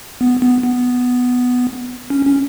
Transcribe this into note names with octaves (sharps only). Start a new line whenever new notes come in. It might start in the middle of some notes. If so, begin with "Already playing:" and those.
B3
B3
B3
C#4
C#4